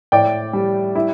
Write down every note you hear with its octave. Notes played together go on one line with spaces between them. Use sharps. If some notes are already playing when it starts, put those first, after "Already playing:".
A2 D5 G5
G3
E4